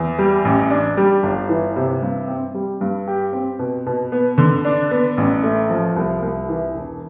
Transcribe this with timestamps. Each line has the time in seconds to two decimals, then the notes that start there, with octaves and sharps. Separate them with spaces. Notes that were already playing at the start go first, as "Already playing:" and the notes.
Already playing: E2
0.18 G3
0.45 A1
0.70 D4
0.97 G3
1.23 G1
1.49 E3
1.76 C3
2.02 G2
2.28 C4
2.54 G3
2.81 G2
3.08 G4
3.33 C4
3.59 B2
3.86 B2
4.12 B3
4.38 D3
4.65 D4
4.91 B3
5.18 A1
5.44 A3
5.70 F3
5.96 C2
6.22 C2
6.49 E3
6.75 E1